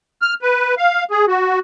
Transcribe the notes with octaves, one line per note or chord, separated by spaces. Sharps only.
F6
B4
F5
G#4
F#4